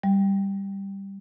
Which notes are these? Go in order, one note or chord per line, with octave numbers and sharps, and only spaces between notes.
G3